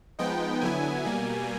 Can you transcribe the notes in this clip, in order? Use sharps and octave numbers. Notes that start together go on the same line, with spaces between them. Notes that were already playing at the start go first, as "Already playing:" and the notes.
F3 G#3 B3 D#4 G5
D3 F#3 B3 E4 G#5
B2 G3 A#3